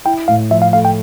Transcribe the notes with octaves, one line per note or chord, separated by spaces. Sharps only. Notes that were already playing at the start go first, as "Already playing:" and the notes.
E4 G5
A2 F5
F3 E5
F5
A3 F5
G5